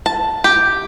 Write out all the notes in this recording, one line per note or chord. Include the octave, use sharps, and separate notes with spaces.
A5
G4